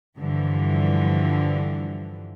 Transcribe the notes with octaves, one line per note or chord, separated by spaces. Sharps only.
G2 D3 E3 F3